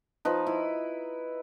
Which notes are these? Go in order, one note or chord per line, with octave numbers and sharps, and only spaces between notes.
F3 D#4 B4
E4